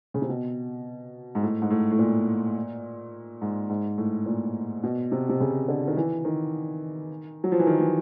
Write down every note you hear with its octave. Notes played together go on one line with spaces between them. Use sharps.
C#3
C3
B2
G#2
A2
G#2
A2
A2
A#2
G#2
G#2
A2
A#2
B2
C3
C3
C#3
D3
D#3
E3
D#3
F#3
F3
E3
D#3
E3